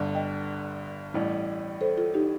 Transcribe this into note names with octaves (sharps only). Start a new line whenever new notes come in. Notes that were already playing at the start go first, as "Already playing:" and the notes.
Already playing: G1 G2 D3
D#5 G5
A1 A2 G3
A4 C5
F4 A4
D#4 G4